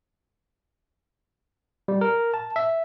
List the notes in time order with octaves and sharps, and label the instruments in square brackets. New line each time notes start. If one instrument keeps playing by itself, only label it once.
[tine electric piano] G3
A#4
A5
E5